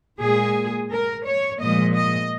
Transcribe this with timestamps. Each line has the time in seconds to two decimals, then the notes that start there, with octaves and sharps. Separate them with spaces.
0.20 A#2 G#3 G#4
0.90 A#4
1.25 C#5
1.60 A#2 F3 G#3 D#5
1.95 D#5